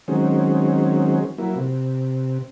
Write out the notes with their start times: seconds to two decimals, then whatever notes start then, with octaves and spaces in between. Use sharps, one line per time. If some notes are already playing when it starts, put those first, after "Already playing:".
0.08 D#3 F#3 G#3 C4 C#4
1.38 F#3 A#3 E4
1.56 C3